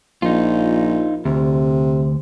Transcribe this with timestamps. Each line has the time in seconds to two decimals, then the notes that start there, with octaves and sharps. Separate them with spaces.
0.22 A#1 D#4 F4
1.25 D2 C3